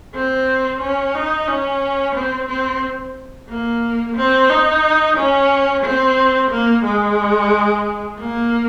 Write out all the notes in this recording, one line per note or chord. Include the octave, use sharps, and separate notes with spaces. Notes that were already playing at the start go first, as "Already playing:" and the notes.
C4
C#4
D#4
C#4
C4
C4
A#3
C4
D#4
C#4
C4
A#3
G#3
A#3